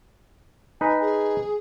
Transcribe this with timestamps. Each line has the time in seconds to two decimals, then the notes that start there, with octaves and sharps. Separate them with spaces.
0.81 D#4 B4 G#5
1.01 G#4